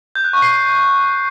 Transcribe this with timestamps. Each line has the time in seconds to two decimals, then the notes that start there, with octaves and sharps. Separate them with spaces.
0.15 G6
0.24 F#6
0.33 C#6
0.42 C7